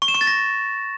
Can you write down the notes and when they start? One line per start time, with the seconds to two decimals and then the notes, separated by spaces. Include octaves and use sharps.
0.02 C#6
0.08 E7
0.15 C#6
0.21 A6
0.27 A#6